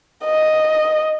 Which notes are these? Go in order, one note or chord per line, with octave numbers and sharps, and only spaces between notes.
D#5